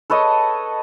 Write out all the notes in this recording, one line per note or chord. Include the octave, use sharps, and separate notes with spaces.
A4 B4 C#5 D#5